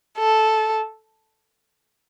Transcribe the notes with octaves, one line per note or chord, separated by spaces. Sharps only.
A4